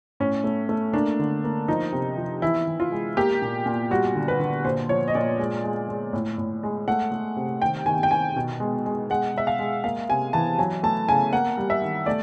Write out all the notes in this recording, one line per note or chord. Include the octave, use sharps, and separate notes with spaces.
A2 C#4
A3
A3
A#3 D4
D3
A#3
F3 D#4
C3
F3
E3 E4
E3
F4
G#3
A#3 G4
A#2
A#2
G3 F#4
D3
B4
D3
A#2 C5
F3 C#5
D#5
A#2 D5
G#3
G#3
G#3
A2
A2
G#3
A3 F#5
A3
C3
D#3 G5
D#3 G#5
G5
D#3 G#5
B2
G#3
G#3
G#3 F#5
G#3 E5
F5
G#3
A#3 F5
C3 G#5
E3 A5
F#3 G#5
A3 A5
C#3 G#5
A#3 F#5
G3
E5
D#3
A3 D5